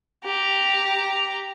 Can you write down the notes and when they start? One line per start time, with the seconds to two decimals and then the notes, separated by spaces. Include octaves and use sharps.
0.24 G4 A#5